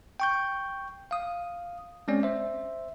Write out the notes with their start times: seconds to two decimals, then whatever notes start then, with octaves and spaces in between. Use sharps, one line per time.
0.20 G5 C#6 G6
1.11 F5 D#6
2.08 G#3 C4 C#4 D5
2.23 C5 E5